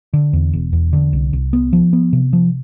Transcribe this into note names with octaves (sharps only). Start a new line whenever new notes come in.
D3
E2
E1
E2
D3
C2
C2
B3
F3
B3
C3
F3